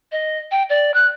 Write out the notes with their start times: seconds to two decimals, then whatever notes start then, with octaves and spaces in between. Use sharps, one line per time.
0.12 D#5
0.51 G5
0.70 D5
0.94 F#6